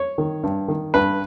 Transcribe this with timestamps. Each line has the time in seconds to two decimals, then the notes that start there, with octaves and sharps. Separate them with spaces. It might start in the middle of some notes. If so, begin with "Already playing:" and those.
Already playing: C#5
0.18 D#3
0.43 G2
0.68 D#3
0.94 G2 B4